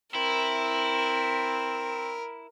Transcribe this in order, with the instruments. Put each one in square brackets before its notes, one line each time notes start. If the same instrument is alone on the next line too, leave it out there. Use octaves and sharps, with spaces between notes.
[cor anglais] C4 [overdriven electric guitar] E4 [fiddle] A#4